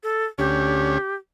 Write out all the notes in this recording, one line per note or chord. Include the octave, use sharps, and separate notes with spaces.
A4
D2 C#4 G4